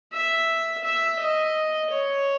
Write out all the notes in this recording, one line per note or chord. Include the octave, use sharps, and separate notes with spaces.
E5
E5
D#5
C#5